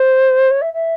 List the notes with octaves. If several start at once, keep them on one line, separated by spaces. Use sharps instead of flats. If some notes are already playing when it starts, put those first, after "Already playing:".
Already playing: C5
C#5
E5
E5